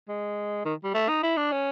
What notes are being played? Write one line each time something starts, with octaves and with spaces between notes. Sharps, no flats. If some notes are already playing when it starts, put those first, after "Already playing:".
G#3
D#3
G3
A3
D#4
E4
D4
C#4